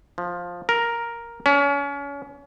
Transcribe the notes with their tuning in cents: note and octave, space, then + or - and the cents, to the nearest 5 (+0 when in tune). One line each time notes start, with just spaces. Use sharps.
F3 +10
A#4 +5
C#4 +30